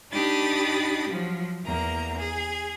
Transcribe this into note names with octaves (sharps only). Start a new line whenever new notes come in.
D4 D#4 G4 B5 D#6 A6
F3 F#3
E2 A#3 A#5
G#4